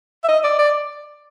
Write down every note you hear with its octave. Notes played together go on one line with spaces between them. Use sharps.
E5
D#5
D5
D5